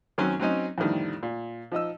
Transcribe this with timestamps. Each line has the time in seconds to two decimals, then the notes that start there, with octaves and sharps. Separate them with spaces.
0.18 F#2 D#3 F#3 C4 C#4
0.40 F#3 C4 C#4 D#4
0.78 F2 A2 D3 D#3 G3
1.23 A#2
1.72 F3 D#4 D#5 E6